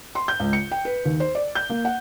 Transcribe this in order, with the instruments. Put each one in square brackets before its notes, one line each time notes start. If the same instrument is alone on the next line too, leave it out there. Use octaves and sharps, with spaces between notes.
[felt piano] C6
G6
C#2
C#7
G5
B4
D#2
C5
D5
G6
A#3
F#5